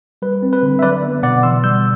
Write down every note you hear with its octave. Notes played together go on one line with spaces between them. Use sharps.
G3 B4
C4
B4
D3
E5
F#3 B4 D5
B3
B2 D5 F#5
E3 C6 E6
G3 E6 G6